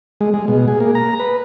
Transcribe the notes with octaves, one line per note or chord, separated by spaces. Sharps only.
G#3
G#3
B2
G#4
A#3
A#5
B4